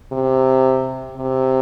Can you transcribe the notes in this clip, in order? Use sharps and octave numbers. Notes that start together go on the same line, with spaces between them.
C3
C3